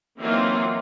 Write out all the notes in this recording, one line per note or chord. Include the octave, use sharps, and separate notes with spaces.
E3 F#3 A#3 C4 D#4 F4